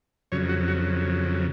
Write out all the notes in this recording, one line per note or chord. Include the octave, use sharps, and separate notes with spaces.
F2 C#3 F#3 C#5
F#4
F#4